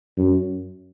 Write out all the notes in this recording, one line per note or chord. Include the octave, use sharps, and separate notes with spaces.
F#2